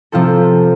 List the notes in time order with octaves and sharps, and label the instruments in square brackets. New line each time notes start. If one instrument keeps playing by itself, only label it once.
[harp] C3 F3 C4 F4 A4